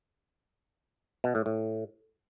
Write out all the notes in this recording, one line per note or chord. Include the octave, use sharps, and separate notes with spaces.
B2
A2
A2